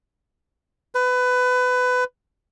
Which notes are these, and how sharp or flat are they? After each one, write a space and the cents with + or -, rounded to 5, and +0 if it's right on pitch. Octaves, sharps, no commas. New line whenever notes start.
B4 +20